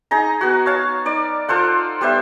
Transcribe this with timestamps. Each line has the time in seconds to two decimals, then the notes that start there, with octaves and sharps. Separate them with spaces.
0.11 D#4 G#4 A#5
0.41 B3 F#4
0.66 C#5 F5 A5
1.05 D#4 D5
1.48 F4 A4 C5 F#5
2.01 G3 B3 C5 E5